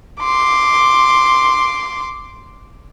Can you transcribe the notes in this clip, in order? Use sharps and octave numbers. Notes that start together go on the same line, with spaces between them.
C6 D6